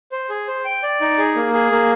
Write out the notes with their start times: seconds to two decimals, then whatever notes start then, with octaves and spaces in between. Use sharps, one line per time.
0.12 C5
0.29 G#4
0.48 C5
0.65 G5
0.83 D5
1.01 D#4
1.18 G#4
1.35 A#3
1.54 G#4
1.72 A#3